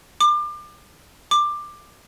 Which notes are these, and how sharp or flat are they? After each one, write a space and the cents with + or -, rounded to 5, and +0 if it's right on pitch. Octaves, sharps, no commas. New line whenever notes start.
D6 +30
D6 +15